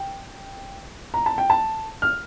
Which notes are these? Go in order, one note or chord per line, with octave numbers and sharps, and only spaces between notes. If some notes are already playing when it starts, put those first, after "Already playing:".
Already playing: G5
A#5
A5
G5
A5
F6